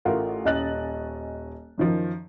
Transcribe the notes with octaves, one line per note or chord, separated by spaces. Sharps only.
A1 A3 F4 A#4 F#5
D#1 C#4 D#5 F#6 A6 F#7
F#2 D#3 F3